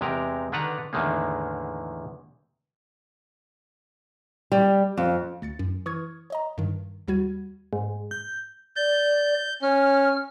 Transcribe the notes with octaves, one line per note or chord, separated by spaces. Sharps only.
E2 C3 G#3 G4 A#4 A#5
D3 D#3 D4 B4 F#5 A#5
E2 A2 D3 D#3 G#3 A#3
G3
F2
D2 A6 C#7
F#2
E3 C#6 D#6 F6 G#6
C#5 D#5 A#5
G2 D#3
D#2 G3 F#4 G#6 D#7
G#2
G6
D5 G6
C#4 F6